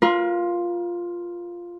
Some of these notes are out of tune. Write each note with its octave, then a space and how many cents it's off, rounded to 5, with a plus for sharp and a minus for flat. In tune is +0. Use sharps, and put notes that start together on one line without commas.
F4 +0 A#4 +40